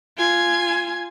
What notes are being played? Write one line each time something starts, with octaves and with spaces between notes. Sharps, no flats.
F4 G#5